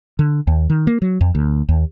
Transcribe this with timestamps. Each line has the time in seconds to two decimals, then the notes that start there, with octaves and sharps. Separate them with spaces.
0.19 D3
0.47 D#2
0.70 D#3
0.87 A#3
1.02 F#3
1.21 F2
1.35 D2
1.69 D#2